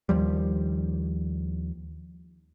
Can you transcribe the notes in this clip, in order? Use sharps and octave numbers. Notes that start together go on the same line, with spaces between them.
D#2 F3 G3